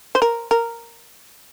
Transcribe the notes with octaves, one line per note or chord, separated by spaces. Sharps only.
C5
A#4
A#4